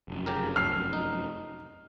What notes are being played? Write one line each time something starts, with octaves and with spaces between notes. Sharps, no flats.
F1 F#2
C#3 G4 A#4
A4 F6 C7
D#4